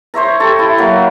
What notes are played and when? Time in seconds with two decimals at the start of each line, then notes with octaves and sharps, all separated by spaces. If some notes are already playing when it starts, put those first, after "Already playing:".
0.14 C5 C#5 E5 A#5
0.40 G4 A4
0.59 E4
0.78 F#3 A#3